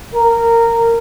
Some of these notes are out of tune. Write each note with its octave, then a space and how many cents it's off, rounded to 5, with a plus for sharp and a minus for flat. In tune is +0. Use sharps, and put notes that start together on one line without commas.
A#4 -15